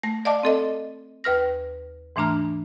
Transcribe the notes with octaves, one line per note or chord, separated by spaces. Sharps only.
A3 A#6
D5 D#5 F5 A5 D6
C4 A4 D#5
D#2 B4 F6 A#6
G#2 E3 A3 D4 A#5 F6